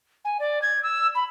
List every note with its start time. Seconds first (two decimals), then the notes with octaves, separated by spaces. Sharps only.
0.25 G#5
0.39 D5
0.62 G#6
0.83 E6
1.15 B5